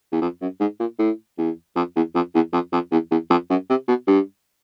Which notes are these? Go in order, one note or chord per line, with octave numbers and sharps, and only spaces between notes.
E2
F2
F#2
G#2
A#2
A2
E2
F2
E2
F2
E2
F2
F2
E2
E2
F2
F#2
C3
B2
G2